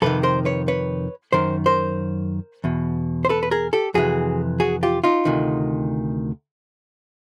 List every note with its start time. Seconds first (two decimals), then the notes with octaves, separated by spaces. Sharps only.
0.02 F2 C3 D#3 A4 B4
0.23 A#4 C5
0.45 B4 C#5
0.68 B4 C#5
1.33 F#2 D#3 A#4 C5
1.66 A#4 C5
2.64 E2 B2
3.25 C5
3.29 A4 B4
3.43 B4
3.51 G#4 A#4
3.73 G4 A4
3.94 F2 C3 E3 F#4 G#4
4.60 F#4 G#4
4.83 F4 G4
5.04 D#4 F4
5.25 D2 C3 D#3